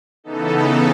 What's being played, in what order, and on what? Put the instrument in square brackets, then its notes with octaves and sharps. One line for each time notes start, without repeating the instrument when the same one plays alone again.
[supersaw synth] C#3 E3 B3 D#4 A4